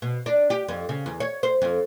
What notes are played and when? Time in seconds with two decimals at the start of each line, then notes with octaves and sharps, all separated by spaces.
0.02 B2
0.26 D4
0.50 G4
0.68 F2
0.89 C#3
1.06 E2
1.20 C#5
1.43 C5
1.62 F2